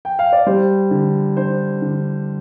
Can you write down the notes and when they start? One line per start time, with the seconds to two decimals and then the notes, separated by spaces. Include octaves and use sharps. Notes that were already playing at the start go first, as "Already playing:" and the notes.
0.05 G5
0.19 F5
0.33 D5
0.47 G3 C5
0.91 D3
1.37 D4 C5
1.82 D3